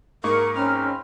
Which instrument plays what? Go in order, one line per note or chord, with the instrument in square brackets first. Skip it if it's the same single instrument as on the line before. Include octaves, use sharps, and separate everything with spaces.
[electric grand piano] G#2 A#3 D#4 [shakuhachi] A#4 [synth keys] C#6
[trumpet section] C4 A#4 B5 [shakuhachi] C#4 [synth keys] F6